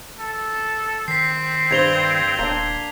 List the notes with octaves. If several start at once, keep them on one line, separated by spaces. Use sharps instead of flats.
A4
D#3 C4 B6 C7
G2 C5 G#6 F7 G7
D#1 A#3 D4